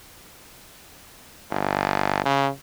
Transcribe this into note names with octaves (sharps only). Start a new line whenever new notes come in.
G1
C#3